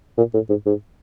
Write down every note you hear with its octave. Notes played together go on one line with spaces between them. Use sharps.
A#2
A2
G#2
G#2